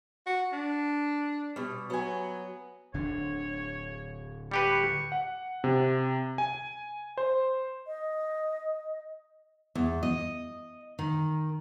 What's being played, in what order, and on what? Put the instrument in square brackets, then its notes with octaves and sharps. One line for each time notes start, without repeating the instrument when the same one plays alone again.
[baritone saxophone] F#4
D4
[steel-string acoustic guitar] B2 G3
[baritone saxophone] F#3 [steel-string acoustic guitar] B3 G#5
[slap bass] D1 D3 D4 [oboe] C#5
[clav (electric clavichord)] G3 G4 B4 [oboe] C#6
[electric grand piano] F#5
C3
G#5
C5
[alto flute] D#5
[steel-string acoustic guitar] E2
D#5
D#3